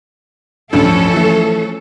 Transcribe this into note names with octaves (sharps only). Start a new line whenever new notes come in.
A1 D2 G2 F3 C#4 A4
E3 A3